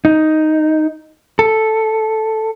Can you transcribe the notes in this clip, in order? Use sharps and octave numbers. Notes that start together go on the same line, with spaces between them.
D#4
A4